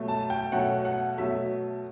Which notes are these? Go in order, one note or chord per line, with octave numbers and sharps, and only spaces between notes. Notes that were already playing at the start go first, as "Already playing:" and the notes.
Already playing: B2 F#3 A3
A5
G5
B2 F#3 A3 F#5
F#5
B2 F#3 A3 E5